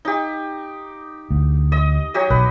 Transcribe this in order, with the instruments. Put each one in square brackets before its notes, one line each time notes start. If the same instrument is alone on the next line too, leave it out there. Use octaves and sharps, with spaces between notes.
[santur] D#4 G4
[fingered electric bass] D2
[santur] D#5
F#3 G4 D#5
[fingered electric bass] B1 [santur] B4